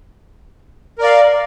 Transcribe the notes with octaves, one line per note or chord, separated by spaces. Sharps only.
A#4 D5 F5